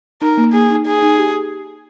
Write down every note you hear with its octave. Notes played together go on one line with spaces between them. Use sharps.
D#4 A#4
A#3
A#3 G#4
D#4
D#4 G#4
D#4
G4